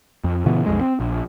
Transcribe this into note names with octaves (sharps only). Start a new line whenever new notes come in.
F2
A#2 C#3 E3 B3
B1 F2 G#3
C4
A#1